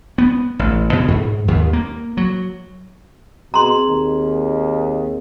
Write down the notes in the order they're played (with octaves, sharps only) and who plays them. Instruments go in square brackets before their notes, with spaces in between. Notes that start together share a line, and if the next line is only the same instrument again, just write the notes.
[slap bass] B3
A1
B2
G#2
D#2
A#3
F#3
[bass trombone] B2 [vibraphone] C4 G#4 [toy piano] A#5 C6
[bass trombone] D#2